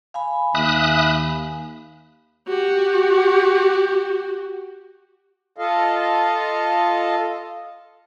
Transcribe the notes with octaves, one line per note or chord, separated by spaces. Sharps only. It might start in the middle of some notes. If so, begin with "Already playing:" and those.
F5 G#5 B5
D#2 E5 D#6 F#6
F#4 G4
F4 A4 D#5 F5